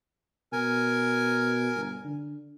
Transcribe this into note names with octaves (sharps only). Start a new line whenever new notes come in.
B2 A#4 G#5
G1
D3